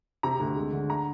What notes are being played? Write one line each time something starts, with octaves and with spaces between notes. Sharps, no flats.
C3 A#5
D2
G#3
D3
A#5